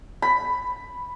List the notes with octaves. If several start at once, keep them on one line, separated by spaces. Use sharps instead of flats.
B5